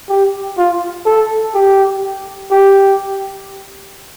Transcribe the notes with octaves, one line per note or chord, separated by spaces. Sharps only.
G4
F4
A4
G4
G4